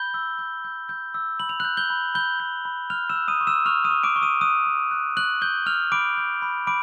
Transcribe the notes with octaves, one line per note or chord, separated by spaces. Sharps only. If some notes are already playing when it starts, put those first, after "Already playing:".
Already playing: B5 G6 G7
E6
G6
G6
G6
E6
B5 F#7
F7
F#6 G6 F#7
G6 G7
B5
B5 G6 G7
G6
B5
F6 F#6 F7
E6 E7
F#6
D#6 D#7
C#6
E6 E7
C#6 F6 F7
D#6 D#7
C#6
D6 D7
C#6
D#6 D#7
D#6 F#6 D#7
C#6
F#6
C#6 F#6 F#7
F#6 G6 G7
F6 F#6 F7
B5 D6 D7
G6
B5
B5 D6 D7